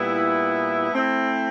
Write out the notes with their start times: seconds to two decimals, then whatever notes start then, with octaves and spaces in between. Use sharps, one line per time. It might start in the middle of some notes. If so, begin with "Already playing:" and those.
Already playing: A#2 G3 B3 E4
0.92 A3 C4 E4